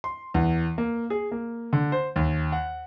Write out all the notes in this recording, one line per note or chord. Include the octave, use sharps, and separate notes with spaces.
C6
E2
A#3
G#4
A#3
D3
C5
D#2
F#5